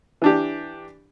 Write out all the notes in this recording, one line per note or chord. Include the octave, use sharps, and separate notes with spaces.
E3 D4 G4